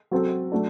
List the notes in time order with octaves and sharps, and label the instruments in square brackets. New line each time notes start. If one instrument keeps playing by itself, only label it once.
[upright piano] F#3 C4 F#4 A4
F#3 A3 D4